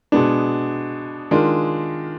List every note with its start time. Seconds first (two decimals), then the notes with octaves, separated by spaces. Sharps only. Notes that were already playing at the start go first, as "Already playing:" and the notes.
0.12 B2 G#3 B3 D4
1.31 D#3 G#3 D4 F4